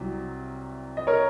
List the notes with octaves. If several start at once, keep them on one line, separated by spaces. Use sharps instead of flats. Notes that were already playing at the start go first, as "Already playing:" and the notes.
Already playing: C2 C3 F#3
D#5
A#4 C#5